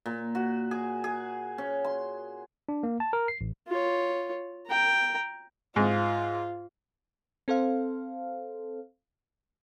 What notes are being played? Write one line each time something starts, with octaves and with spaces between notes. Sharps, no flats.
A#2
F#4
G#4
G#4
C#4
C6
D4
A#3
A5
A#4
C7
A1
F4 C#5
G5 A#5
G#2 F4
C4 A4 C5 F5